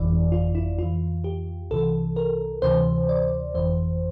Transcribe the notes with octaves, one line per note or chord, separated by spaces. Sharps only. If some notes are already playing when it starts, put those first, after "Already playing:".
Already playing: G1 F2 E3 D5
F4
E4
F2 E3 F4
G4
C2 C3 E3 A4
A#4
D2 C3 E3 C5
D5
G1 F2 E3 C5